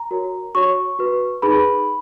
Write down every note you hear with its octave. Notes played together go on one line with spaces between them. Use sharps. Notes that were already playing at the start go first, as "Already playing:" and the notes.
Already playing: A#5
F#4 A#4 C#5
F#4 C#5 C#6
F#4 B4
D#4 G#4 B4 B5